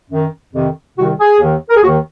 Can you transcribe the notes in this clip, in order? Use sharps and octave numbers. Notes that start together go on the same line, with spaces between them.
F#2 D#3
F2 C3 D#3
C2 C3 D#3 F#4
G#4
D#2 D#3
A#4
G#4
D#2 D#3 F#4